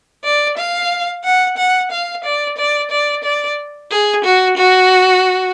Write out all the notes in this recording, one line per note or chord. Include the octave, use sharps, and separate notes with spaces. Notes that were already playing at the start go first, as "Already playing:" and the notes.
D5
F5
F#5
F#5
F5
D5
D5
D5
D5
G#4
F#4
F#4